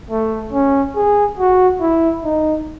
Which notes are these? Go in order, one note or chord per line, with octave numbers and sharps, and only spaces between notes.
A3
C#4
G#4
F#4
E4
D#4